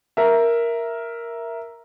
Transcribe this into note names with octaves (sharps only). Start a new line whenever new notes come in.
A#4 E5